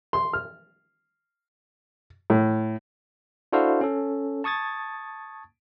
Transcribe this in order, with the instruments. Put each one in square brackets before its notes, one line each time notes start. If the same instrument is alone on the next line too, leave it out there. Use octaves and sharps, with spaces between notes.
[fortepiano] C6
F6
A2
[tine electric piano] D4 E4 F#4 A4 C5 F5
C#4 A4
A5 C#6 D#6 G#6 A6